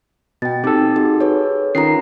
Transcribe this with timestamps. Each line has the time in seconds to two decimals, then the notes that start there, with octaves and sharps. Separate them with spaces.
0.42 B2 G5 A6
0.64 C4 D#4 G4 A4
0.96 D#4 F#4 G#4
1.21 G#4 B4 C#5
1.75 D#3 C#4 F4 A#5 C7